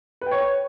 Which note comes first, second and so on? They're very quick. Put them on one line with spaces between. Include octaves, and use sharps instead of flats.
B4 G5 C#5